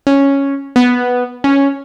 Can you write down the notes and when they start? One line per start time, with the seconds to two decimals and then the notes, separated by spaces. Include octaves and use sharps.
0.07 C#4
0.76 B3
1.44 C#4